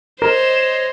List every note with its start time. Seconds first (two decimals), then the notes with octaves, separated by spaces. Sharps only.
0.22 A#4 C5 C#5 D#5 E7